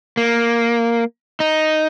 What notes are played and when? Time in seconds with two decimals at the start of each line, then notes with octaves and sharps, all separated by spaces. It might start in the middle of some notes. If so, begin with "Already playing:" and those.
0.17 A#3
1.40 D#4